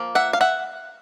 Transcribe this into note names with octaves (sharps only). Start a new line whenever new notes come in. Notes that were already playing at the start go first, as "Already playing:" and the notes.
Already playing: F3 A#3
E5 F#5
F5
E5 F#5